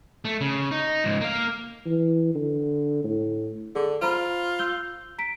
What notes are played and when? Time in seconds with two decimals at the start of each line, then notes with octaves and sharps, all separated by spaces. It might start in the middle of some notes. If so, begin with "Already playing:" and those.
0.25 A3
0.41 C#3
0.71 D#4
1.04 C#2 G#2
1.21 A#3 F5
1.86 E3
2.35 D3
3.04 A2
3.75 D3 G#4
4.02 F4 C5 A#5 B5
4.59 E6 G6 G7
5.18 A#5 B6 D7